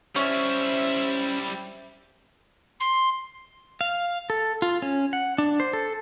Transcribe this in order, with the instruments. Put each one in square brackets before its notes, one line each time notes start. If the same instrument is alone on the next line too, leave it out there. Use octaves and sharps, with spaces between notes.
[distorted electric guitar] G3 E4 [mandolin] C#4 [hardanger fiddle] C5 E5
[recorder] C6
[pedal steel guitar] F5
A4
F4
C#4
F#5
D4
C5
A4